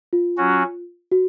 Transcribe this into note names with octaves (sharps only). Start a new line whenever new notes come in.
F4
F#3 C#4 F#4
F#4